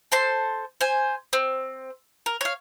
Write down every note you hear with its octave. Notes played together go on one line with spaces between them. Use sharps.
A4 C5 C6
C5 G#5
C4
A#4
C#5 F5